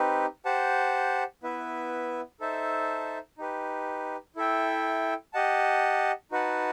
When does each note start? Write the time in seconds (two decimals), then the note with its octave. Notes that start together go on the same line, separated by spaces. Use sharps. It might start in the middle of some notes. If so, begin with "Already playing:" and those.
Already playing: C4 D#4 G4 B4
0.45 G4 C5 F#5 A5
1.43 B3 E4 B4 E5
2.40 D#4 A4 C5 E5 A5
3.38 D#4 G4 B4
4.36 E4 A4 E5 G5
5.33 G4 D#5 F#5 A5
6.31 D#4 F#4 B4 F#5 A5